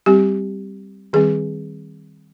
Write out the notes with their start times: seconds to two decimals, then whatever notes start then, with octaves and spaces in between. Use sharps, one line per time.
0.06 G3 C4 G4
1.13 D#3 G3 C4 G#4